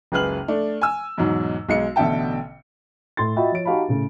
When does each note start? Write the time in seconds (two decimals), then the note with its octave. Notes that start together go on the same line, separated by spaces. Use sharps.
0.12 F#1 C#2 G#4 B4 F6 F#7
0.48 A3 D4
0.81 G#5 E6
1.18 E2 G#2 B2 F#3 D#4
1.69 B1 G#3 C#7
1.96 A1 B2 D3 E5 G5 A5
3.17 A2 C6 A6
3.36 F4 F#4 D#5 E5 G5 B5
3.52 F3 C#5 D7
3.65 D#4 F#4 G4 F5 A5 B5
3.88 A2 C#3